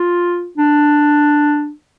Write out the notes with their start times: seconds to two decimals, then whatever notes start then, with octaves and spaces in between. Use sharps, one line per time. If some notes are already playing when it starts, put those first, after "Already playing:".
Already playing: F4
0.57 D4